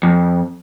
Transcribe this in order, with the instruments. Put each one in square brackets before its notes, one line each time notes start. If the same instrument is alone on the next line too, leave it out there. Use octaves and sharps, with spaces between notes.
[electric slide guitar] F2